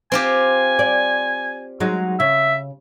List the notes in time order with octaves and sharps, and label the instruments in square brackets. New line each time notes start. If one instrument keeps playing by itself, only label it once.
[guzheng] C4 F4 G4 [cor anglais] G#5
[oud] D5
F#3 G#3 D#4
[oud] C#3 [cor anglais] E5